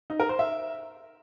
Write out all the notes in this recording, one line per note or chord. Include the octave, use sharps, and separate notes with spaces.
D#4
A#4
C5
E5